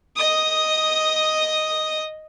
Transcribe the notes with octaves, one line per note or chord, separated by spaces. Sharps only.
D#5 D#6